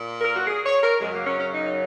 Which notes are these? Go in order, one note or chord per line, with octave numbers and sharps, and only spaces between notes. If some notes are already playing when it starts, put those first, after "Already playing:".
Already playing: A#2
A#4
F#4
G#4
C#5
A#4
F#2 C#3 F#3 G#3
A#3
C#4
C#4
D#4